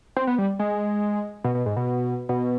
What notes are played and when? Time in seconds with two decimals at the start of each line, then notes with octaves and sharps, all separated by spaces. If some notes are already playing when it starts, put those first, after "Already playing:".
0.17 C4
0.27 B3
0.38 G3
0.59 G#3
1.44 B2
1.55 B2
1.66 G#2
1.76 B2
2.29 B2